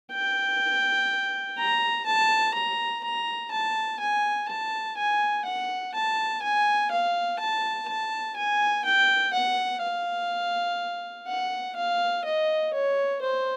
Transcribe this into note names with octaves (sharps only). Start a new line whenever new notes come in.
G5
A#5
A5
A#5
A#5
A5
G#5
A5
G#5
F#5
A5
G#5
F5
A5
A5
G#5
G5
F#5
F5
F#5
F5
D#5
C#5
C5